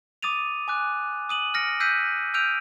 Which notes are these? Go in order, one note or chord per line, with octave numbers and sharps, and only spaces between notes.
D6 D#6 A6 D#7 F7
G#5 D6 F#6
D#6 D#7 F#7
F6 A#6 C#7 D7
E6 F#6 G6 B6 C7 D#7
E6 F6 G6 D7 D#7 F7